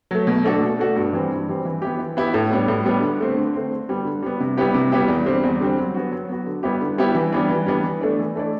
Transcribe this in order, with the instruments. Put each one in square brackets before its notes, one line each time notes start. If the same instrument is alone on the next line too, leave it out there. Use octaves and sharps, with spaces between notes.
[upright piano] F#3 A3
B2
A3 D4 F#4 A4
B2
A3 D4 F#4 A4
G2
E3 G3 C4
G2
E3 G3 C4
E3
B3 E4 G4
E3
B3 E4 G4
A2
G3 B3 D4
A2
G3 B3 D4
D3
A3 C4
D3
A3 C4
D3
G3 B3
D3
G3 B3
C3
G3 B3 E4 G4
C3
G3 B3 E4 G4
E2
D3 G3 C4
E2
D3 G3 C4
F#3
B3 F#4
F#3
B3 F#4
D3
G3 B3 E4 G4
D3
G3 B3 E4 G4
E3
G3 B3 D4
E3
G3 B3 D4
E3
A3 D4 A4 D5
E3
A3 D4 A4 D5